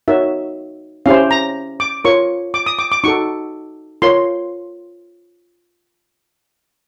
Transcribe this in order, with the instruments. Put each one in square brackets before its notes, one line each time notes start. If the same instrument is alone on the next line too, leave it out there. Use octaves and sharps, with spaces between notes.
[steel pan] D#4 F#4 A#4 C#5 E5
C#4 E4 G4 C5 F5
A#5
D6
F4 A#4 C#5 C#6
D6
D#6
D6
D6
D#4 F#4 A4 C#6
F4 A#4 C#5 C6